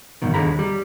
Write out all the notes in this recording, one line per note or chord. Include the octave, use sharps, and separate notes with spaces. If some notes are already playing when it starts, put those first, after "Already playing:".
E2 G2 B2 D#3
D#2 D3 G#4 A#5 B5
G3